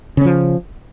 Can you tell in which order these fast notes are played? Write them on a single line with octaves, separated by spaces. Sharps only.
C#3 C#4 F3